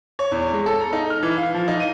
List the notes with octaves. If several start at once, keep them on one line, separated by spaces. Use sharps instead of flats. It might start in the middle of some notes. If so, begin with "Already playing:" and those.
C#5
E2
G#3
A4
A#5
D#4
F6
E3
F5
F3
D#4
D#7